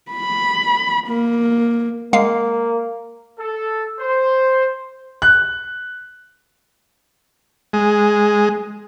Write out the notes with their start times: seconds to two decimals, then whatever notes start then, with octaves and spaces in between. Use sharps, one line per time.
0.11 B5
1.07 A#3
2.13 G#3 A#3 F5 C7
3.39 A4
3.99 C5
5.22 F#6
7.73 G#3